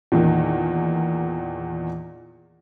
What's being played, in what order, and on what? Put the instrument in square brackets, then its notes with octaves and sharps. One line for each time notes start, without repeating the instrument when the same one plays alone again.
[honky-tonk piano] E2 A#2 D#3